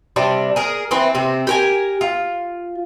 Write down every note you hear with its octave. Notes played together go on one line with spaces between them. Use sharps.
C3 G3 D4
G#4 A#4
E3 C4
C3 C4
G4 A#4 G#5
F4